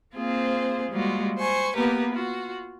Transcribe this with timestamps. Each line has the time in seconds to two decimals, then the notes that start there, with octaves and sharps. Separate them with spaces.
0.15 A#3 C4 F4 G#4 C5
0.91 G3 G#3 A#3 F4 F#4
1.38 C5 G#5 C#6
1.75 A#3 B3 G4 A#4 B4
2.11 F4 F#4